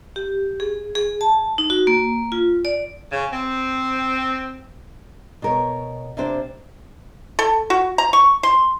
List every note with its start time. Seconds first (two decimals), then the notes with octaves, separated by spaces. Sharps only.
0.16 G4
0.60 G#4
0.95 G#4
1.21 A5
1.58 D#4
1.70 F#4
1.87 A#3
2.32 F4
2.65 D5
3.11 C#3
3.33 C4
5.42 B2 A#4 C#5
6.17 C3 A#3 D4 C5
7.39 A4
7.70 F#4
7.98 A#5
8.13 C#6
8.43 C6